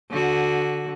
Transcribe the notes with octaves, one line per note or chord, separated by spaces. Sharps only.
D3 F#4